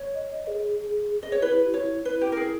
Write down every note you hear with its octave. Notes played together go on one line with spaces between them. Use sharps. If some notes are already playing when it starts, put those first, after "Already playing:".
Already playing: C#5
D#5
G#4
D#5
C#5
E4 B4
G4
E4 C#5
E4 B4
G4
A#4
G#4